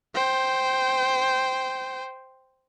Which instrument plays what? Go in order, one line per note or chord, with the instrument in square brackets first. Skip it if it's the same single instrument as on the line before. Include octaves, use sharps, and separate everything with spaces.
[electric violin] C5 G5